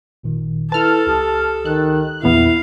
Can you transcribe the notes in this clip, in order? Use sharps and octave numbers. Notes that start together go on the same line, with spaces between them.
G#1 A#2 D#3
E4 A4 B4 A5 F6
C#2 G4 D#6
D#3 F#6
A#1 E2 B3 E4 F5